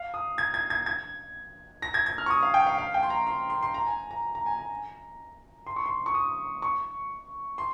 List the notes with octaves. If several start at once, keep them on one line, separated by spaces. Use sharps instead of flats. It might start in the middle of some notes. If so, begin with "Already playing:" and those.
Already playing: F5
D#6
G#6
G#6
G#6
G#6
A#6
G#6
G#6
F6
C#6
D#6
F5
G5
F5
F5
G5
C6
A#5
C6
C6
C6
A#5
G#5
A#5
A#5
G#5
A#5
C6
C#6
C6
C#6
D#6
C#6
C6